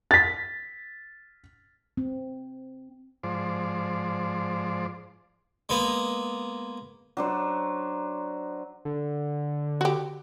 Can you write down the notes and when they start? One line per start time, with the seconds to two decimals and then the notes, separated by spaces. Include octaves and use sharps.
0.11 A6 B6
1.97 C4
3.23 G#2 F3 C5 D5
5.69 G#3 A#3 B3
7.17 F#3 D4 C5
8.85 D3
9.81 F#4 G4